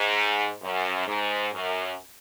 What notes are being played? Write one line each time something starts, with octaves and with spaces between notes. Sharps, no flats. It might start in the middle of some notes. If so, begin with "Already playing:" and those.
Already playing: G#2
F#2
G#2
F#2